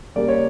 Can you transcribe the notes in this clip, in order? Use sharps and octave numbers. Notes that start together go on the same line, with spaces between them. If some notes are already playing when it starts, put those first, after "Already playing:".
C#3 G3 A#3 D5
C#5